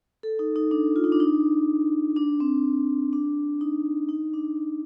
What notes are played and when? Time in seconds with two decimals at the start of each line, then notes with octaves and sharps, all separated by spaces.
0.23 A4
0.39 D#4
0.56 D#4
0.71 D4
0.96 F4
1.04 D#4
1.12 D4
1.20 D#4
2.16 D4
2.40 C4
3.13 D4
3.61 D#4
4.09 D#4
4.33 D4